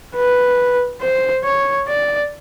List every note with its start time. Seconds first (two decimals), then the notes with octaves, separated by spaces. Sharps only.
0.16 B4
1.02 C5
1.45 C#5
1.88 D5